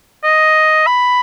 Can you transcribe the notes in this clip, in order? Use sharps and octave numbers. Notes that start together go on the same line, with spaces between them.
D#5
B5